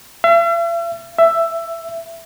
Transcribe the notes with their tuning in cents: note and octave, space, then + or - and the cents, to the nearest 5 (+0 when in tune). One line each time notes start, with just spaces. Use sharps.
E5 +45
E5 +10